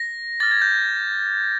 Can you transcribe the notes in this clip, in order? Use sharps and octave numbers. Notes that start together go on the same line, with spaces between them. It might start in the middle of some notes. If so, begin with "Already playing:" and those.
Already playing: A#6
D6 F6 A6
G#6
G6